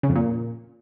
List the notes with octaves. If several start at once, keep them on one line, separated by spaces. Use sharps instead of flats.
C#3
F2
A#2